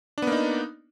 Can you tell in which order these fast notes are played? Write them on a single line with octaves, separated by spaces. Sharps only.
D4 B3 A#3 D#4